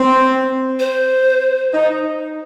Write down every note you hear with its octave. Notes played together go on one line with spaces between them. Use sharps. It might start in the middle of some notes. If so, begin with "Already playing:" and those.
Already playing: C4
C5
D#4